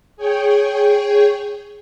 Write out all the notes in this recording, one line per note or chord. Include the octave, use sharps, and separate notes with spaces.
G#4 C#5 G5